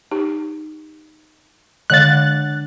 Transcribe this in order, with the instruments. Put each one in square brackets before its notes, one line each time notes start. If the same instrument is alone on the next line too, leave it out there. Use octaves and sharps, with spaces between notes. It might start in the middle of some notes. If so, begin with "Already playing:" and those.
[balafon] D#4 G4
[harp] D3 D5 F#5 [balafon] G#3 C#5 F5 [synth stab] F#6 A6